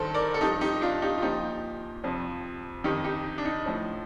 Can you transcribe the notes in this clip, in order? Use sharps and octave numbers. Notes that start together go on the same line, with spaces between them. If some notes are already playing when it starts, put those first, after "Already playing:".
Already playing: G2 D#3 A4 C5
A#4 D5
A4
G2 F3 D#4 G4
D#4 G4
D4 F4
D#4 G4
F4
A#2 F3 D#4 G4
F2 C3 F3
F2 D#3 D#4 G4
D#4 G4
D4
D#4
A2 F3